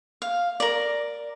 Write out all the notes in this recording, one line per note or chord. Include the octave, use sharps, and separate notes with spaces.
F5
A#4 D5